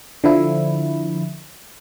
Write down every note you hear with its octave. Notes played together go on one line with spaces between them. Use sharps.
D3 F3 E4